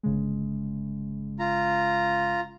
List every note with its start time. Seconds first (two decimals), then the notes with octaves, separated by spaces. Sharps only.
0.03 G1 C#3 G#3
1.39 F4 A#5